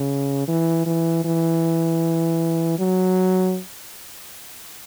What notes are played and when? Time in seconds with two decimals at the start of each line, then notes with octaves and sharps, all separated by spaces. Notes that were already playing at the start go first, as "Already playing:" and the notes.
Already playing: C#3
0.48 E3
0.86 E3
1.25 E3
2.79 F#3